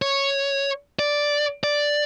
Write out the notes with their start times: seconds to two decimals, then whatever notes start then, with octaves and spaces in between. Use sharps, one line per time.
0.02 C#5
0.99 D5
1.64 D5